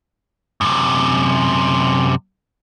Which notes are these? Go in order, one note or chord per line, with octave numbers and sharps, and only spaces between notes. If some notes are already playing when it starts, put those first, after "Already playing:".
F#2 C3